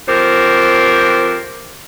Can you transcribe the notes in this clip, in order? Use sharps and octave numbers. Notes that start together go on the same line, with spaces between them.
F2 G4 A#4 C5